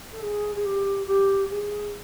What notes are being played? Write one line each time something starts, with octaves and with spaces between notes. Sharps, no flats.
A4
G#4
G#4
G4
G4
G#4